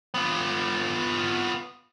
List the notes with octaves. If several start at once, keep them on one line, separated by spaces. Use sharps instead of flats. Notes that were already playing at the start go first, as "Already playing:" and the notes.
B3 F4